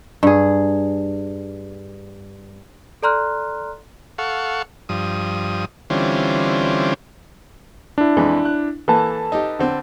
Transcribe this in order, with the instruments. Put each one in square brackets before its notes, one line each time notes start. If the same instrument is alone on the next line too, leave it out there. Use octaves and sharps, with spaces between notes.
[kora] G2 G#4
[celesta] A4 D5 A#5 C6 F6 F#6
[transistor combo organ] A4 F5 F#5 C#6
G2 F3 D#6
D3 E3 G3 C4 C#4 F4
[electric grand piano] D4 E4
[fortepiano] F2 E3 G#3
F#6
[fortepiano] E3 A#3 [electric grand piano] A4 B4 A5
[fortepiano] D#4 G4
D3 C4